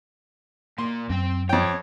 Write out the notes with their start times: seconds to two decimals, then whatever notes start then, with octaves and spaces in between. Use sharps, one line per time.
0.78 A#2 A#3 C6
1.09 F#2 C4 G5
1.49 F2 C#5 G5